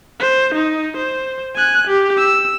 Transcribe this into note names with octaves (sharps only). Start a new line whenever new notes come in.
C5
D#4
C5
G#5 F#6
G4
E6